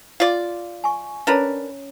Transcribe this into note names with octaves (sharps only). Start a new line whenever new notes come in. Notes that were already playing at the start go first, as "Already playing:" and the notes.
F4 D5
G#5 C#6
C#4 D4 A#4 B4 C#5 A#5